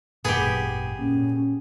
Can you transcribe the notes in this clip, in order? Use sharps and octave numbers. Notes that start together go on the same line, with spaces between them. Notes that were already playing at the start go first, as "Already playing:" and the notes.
G#1 F#2 A#2 B3 G4 G#4
A#2 C#4